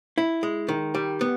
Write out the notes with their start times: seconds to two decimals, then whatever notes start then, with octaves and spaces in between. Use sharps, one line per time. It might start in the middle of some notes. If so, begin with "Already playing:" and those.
0.18 E4
0.43 G#3
0.68 D#3
0.95 G3
1.21 B3